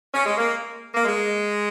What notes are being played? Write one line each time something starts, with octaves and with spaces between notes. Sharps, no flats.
C#4
G#3
A#3
A#3
G#3